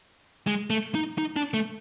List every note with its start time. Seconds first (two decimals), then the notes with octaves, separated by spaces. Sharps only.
0.47 G#3
0.70 A3
0.95 D#4
1.18 D#4
1.36 D4
1.54 A3